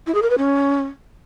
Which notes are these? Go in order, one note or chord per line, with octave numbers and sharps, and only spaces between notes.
E4
G#4
A#4
B4
C#4